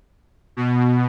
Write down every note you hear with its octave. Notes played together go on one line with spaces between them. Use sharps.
B2